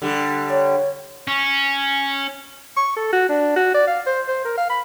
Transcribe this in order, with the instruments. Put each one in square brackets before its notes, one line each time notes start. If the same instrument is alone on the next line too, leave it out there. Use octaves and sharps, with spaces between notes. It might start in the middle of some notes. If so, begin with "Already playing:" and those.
[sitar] D3 G3
[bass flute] C#5
[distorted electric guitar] C#4
[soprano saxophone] C#6
A4
F#4
D4
F#4
D5
F5
C5
C5
A#4
F5
B5